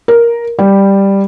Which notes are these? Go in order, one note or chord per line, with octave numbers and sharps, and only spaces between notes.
A#4
G3